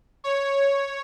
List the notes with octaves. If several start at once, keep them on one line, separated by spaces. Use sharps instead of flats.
C#5